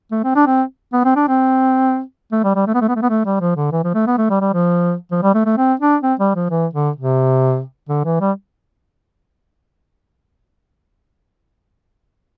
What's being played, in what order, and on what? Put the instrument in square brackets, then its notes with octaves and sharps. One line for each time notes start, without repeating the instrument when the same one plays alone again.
[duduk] A3
C4
D4
C4
B3
C4
D4
C4
A3
G3
G3
A3
B3
A3
B3
A3
B3
A3
G3
F3
D3
E3
F3
A3
B3
A3
G3
G3
F3
F3
G3
A3
A3
C4
D4
C4
G3
F3
E3
D3
C3
D3
E3
G3